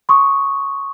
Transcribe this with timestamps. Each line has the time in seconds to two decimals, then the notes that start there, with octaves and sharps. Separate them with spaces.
0.09 C6 C#6 D#6